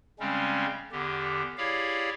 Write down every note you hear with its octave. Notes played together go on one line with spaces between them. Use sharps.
C#3 G3 G#3 C4 C#4
E2 D3 G4
E4 G4 G#4 C#5 D5 F5